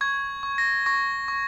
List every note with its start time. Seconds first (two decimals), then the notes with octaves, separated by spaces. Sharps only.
0.01 C#6 G#6
0.43 C#6
0.58 A#6
0.86 C#6 A#6
1.28 C#6